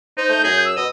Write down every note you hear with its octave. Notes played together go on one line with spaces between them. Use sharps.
D#4 C5
A3 G6
F#2 G#4
E6
B2 D#5